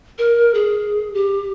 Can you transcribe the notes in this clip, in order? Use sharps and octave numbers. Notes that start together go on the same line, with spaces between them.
A#4
G#4
G4